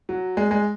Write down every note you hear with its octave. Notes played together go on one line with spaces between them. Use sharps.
F#3
G#3
G#3